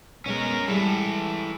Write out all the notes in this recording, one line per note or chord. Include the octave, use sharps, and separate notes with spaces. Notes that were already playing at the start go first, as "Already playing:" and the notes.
B2 G#3 C#4 A#4
E3 G3 G#3 E4 A4